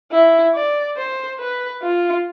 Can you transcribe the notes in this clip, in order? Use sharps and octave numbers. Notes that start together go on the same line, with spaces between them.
E4
D5
C5
B4
F4